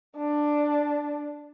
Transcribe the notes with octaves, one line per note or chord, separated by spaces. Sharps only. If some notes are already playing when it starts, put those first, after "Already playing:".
D4